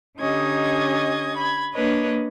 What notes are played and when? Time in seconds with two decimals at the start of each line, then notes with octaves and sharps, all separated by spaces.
0.19 D3 C#4 D#4 G4 D#5 G#6
1.36 B5 G#6
1.74 A#3 D4 B4 C#5 D#5